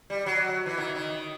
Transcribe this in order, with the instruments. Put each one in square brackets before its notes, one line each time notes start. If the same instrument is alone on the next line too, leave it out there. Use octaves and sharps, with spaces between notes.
[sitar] G3
F#3
E3
D#3
D#3